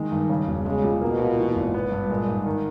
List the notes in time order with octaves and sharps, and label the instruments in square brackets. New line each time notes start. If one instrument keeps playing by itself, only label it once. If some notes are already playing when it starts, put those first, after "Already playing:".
Already playing: [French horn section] D#3 [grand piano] G#3
[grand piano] G2
C#3
E1
[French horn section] C#3 [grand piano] G#3
[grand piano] C#2
[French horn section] B2 [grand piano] A#3
[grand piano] A#2
E3
G#1
B3
G2
[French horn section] A#2 [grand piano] G#3
[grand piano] G#2
D#3